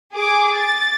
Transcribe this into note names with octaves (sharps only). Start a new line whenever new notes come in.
G#4 D6
A6